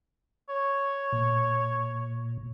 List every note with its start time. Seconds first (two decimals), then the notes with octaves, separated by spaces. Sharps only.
0.49 C#5
1.13 A#2